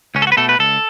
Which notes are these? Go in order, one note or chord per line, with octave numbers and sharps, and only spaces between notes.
C#2 C#4
A4
F#4
B4
B2 A3 A4
B4
C#2 A4